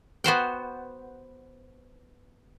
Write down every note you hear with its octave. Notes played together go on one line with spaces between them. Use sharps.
B3 F#4 C5 G5